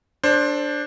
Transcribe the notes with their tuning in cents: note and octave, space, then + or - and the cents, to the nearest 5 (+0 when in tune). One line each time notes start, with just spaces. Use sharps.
D4 +0 A4 +0 C5 +20